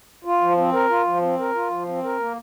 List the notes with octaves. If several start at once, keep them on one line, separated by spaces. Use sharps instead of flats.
F4
F3
C4
A#4
F4
F3
C4
A#4
F4
F3
C4
A#4
A#3